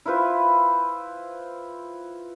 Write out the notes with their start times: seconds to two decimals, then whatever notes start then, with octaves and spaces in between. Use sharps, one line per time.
0.05 E4 F4 B4 C5